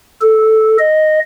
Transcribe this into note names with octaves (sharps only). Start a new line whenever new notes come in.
A4
D#5